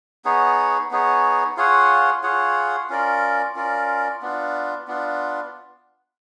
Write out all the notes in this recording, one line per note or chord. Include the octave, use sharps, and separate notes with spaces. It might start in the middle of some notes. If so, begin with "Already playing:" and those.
B3 D#4 G#4 C#5
B3 D#4 G#4 C#5
F4 G#4 C#5 F#5
F4 G#4 C#5 F#5
C#4 F4 A#4 D5
C#4 F4 A#4 D5
B3 D4 F4
B3 D4 F4